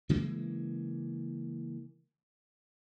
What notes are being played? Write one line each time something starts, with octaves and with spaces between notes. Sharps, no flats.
C#3 E3 G#3 A#3